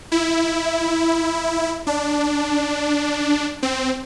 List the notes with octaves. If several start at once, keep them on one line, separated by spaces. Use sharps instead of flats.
E4
D4
C4